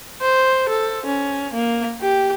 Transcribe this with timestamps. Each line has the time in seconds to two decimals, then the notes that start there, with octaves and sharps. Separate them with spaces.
0.22 C5
0.69 A4
1.06 C#4
1.54 A#3
2.02 G4